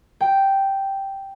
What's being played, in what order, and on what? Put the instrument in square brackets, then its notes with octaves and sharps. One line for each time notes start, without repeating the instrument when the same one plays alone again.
[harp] G5